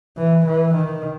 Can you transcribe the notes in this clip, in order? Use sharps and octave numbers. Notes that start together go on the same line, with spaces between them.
E3
E3
D#3